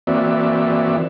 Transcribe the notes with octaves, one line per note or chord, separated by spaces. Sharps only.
E3 A#3 C4 F#4 D5 E5